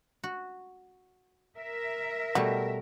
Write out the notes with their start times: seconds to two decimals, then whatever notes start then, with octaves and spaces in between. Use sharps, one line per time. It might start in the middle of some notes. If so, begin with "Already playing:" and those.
0.24 F#4
1.58 A#4 E5
2.35 B2 G3 A3 F#4